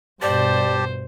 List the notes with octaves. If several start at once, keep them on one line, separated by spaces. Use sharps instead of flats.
G2 B2 G4 C5 D5 A5